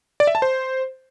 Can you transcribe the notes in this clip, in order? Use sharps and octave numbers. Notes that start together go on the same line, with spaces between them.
D5
E5
A5
C5